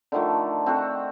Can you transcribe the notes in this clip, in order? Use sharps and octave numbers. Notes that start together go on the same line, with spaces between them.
D3 D#3 F3 A3
C4 F#4 A4 F#5